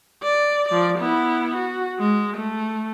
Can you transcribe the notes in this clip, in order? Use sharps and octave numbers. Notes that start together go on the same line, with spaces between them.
D5
F3 D5
B3 E4
F#4
G#3
A3